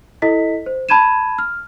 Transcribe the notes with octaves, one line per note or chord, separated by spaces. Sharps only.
E4 A4 D#5 B6
C5
A5 B5 G#6 D#7 E7
F6